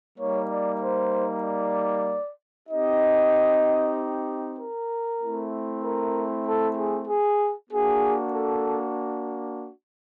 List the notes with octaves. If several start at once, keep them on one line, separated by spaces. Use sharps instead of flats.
G3 A#3 D#4 C#5
D5
C5
D5
C4 D#4 G4 D#5
A#4
A3 C4 E4
A#4
A4
G#4
G#4
A#3 D4 F#4 G#4
A4